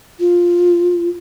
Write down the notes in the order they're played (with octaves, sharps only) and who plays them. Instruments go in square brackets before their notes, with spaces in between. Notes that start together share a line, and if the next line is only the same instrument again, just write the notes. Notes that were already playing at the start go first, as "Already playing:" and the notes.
[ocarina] F4